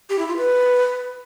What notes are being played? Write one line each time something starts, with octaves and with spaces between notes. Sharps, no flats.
G4
E4
F4
B4